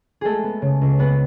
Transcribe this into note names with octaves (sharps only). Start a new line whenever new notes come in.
G#3 A3 G#4 A4
B3
C#3
C#2
G#3 B3 B4